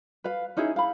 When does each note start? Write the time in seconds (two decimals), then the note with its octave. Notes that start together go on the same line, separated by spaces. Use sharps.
0.24 B4 F5
0.57 C#4 D#4 E4 G#4
0.76 F5 B5